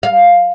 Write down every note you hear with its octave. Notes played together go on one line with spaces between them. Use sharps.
F5